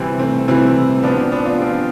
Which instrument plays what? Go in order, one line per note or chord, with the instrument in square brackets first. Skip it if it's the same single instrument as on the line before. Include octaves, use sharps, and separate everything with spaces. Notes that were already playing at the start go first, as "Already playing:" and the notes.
Already playing: [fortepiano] C3 E3 G3 [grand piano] C4 E4
[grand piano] A3 C4
[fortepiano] C3 E3 G3 [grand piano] C4 E4
[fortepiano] F3 C4 G4 [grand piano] B3 D4
[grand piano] B3 D4
D4 F4
[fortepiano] F3 C4 G4